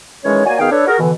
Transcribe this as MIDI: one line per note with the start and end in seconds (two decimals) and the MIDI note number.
0.24 0.46 51
0.24 0.46 52
0.24 0.46 56
0.24 0.46 61
0.24 0.46 68
0.24 0.46 73
0.46 0.57 58
0.46 0.57 66
0.46 0.57 73
0.46 0.57 74
0.46 0.57 80
0.60 0.67 47
0.60 0.67 51
0.60 0.67 59
0.60 0.67 68
0.60 0.67 77
0.60 0.67 79
0.72 0.85 62
0.72 0.85 69
0.72 0.85 71
0.72 0.85 73
0.88 0.97 66
0.88 0.97 68
0.88 0.97 70
1.00 1.12 47
1.00 1.12 50
1.00 1.12 52